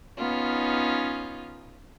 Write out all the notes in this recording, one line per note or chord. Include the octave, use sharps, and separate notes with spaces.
B3 C#4 D#4 F4